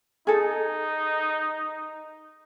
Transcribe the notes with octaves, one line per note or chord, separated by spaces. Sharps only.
D#4 G#4 A4